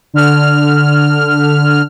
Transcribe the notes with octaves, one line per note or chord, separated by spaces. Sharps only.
D3 F6